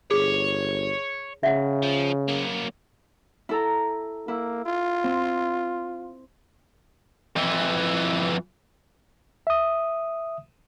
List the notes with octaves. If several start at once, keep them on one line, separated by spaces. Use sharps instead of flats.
G1 G#4 C#5
C#3 E5 F#5
F3
F#3 A#3
E4 A4 A#5
A#3 E4
F4
C4
F2 E3
E5 D#6